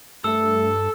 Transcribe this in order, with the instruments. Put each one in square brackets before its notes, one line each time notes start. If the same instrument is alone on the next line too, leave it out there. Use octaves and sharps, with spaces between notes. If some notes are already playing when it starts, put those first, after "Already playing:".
[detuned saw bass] G2 [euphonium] A3 [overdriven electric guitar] A4 [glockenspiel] E6